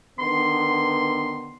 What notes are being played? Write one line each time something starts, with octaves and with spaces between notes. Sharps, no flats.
D3 D#3 B3 C6